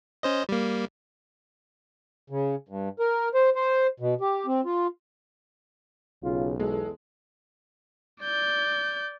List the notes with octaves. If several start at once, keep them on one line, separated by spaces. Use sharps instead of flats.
C#4 C5 D#5
G3 A#3
C#3
G2
A#4
C5
C5
B2
G4
C4
F4
B1 C#3 F4
E2 G#3 A4
D5 G6